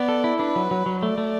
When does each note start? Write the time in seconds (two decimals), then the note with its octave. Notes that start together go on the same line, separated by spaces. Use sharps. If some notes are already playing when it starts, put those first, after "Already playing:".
Already playing: B3 D5
0.08 A4
0.24 E4
0.39 D4 B4
0.56 F#3
0.71 F#3
0.86 F#3
1.02 A3 D5
1.18 A3